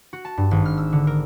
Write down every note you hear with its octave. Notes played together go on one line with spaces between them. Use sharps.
F#4
A5
G2
G#1
F6
E6
D3
A#4